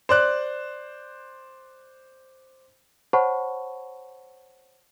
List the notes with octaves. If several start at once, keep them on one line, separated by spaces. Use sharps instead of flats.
C5 D5 F#6
C5 C#5 F#5 A5 B5 C#6